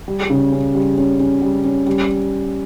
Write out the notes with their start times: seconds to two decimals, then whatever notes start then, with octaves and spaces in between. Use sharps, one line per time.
0.08 G3
0.30 C#3
0.52 C#4
0.75 G3
0.98 C#4
1.20 C#4
1.42 G3
1.64 C#4
1.87 G3